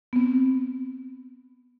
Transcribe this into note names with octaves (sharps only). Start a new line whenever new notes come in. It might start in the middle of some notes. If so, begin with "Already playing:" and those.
B3
C4